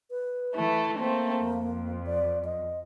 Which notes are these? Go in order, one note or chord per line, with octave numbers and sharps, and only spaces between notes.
B4
E3 A3 E4
A3 A#3 C4
F2
D5
D#5